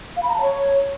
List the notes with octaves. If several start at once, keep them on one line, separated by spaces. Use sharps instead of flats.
F5
B5
A#5
A5
C#5